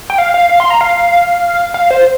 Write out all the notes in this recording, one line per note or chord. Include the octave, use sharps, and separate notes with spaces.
G5
F5
F5
F5
C6
A#5
F5
F5
C5